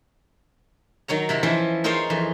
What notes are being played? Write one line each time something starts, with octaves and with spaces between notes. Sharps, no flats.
D#3 F#3 C#5 A#5
C3 E4 B5
E3 F3 C#4 E4
D#4 F4 G#4 A#4 C5 C#5
F2 E3